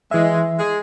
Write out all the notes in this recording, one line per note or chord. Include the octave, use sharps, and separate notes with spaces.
E3 G#3 E5
G#3 G#4